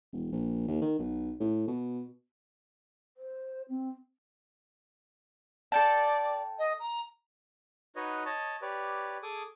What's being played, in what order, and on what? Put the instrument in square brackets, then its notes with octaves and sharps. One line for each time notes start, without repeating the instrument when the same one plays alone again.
[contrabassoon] E1
A#1
D#2
D#3
B1
A2
B2
[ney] C5
C4
[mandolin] A4 G5 A5 [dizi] D5
[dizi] D#5
A#5
[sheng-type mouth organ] D#4 F#4 B4 C#5 D#5
C#5 D#5 A5
G4 B4 C#5 D5
G#4 A4 G#5 D6 D#6